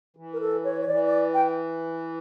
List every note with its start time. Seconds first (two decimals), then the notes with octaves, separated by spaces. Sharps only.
0.17 E3
0.34 A#4
0.40 A4
0.64 C#5
0.81 C#5
0.88 E3 D5
1.05 D5
1.34 G5